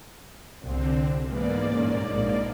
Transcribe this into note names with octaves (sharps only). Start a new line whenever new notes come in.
C2 D3 C4
G#2 E3 A#3 B3 D5
G2 A#2 C#4
A#1